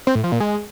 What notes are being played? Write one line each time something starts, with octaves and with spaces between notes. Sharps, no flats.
C4
A2
F3
A#2
G#3